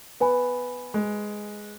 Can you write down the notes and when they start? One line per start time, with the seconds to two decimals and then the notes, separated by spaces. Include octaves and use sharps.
0.20 B3 B4 G#5 B5
0.94 G#3